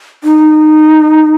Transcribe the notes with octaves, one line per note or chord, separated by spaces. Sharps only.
D#4